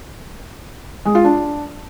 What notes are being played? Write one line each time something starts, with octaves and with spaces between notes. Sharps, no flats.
G#3
F4
D4